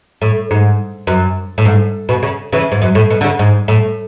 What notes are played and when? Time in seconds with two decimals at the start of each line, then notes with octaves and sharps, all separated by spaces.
0.21 A2
0.51 G#2
1.07 F#2
1.58 A2
1.65 G#2
2.09 B2
2.23 C#3
2.52 C#3 E3
2.71 G#2
2.82 F#2
2.95 A2
3.10 B2
3.21 D3
3.24 C#3
3.39 G#2
3.68 A2